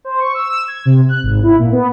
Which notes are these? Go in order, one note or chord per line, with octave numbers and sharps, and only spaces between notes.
C5
C#6
E6
E6
G#6
C3
F#6
G#1
E4
A#2
B3